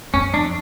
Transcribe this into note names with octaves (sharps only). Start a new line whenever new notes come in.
F#2 C#4
F2 D4